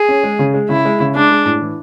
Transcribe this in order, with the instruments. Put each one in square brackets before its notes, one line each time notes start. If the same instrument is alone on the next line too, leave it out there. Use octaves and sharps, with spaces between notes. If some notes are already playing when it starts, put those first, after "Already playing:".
Already playing: [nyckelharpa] G#4
[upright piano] C#4
G#3
C#3
G#3
[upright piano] C#3 [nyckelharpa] E4
[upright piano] G#3
C#3
[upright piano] G#3 [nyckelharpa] D4
[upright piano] G#3
A2
E3